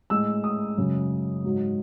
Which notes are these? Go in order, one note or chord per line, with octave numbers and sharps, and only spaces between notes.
A2 G#3 E6
D#6
F#2 C#3 G#3
G#2 F#3